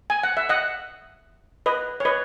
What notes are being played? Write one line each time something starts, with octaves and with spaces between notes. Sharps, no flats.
G#5
F#5
E5
D#5 F#5
B4 D#5
C#5
B4 D#5